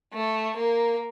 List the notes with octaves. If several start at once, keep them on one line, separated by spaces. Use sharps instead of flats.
A3
A#3